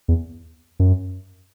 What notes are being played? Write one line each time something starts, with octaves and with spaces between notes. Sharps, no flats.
E2
F#2